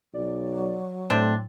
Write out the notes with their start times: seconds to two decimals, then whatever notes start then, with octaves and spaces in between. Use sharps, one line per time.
0.14 B1 F#3 D5
1.10 A2 C3 A3 C4 D4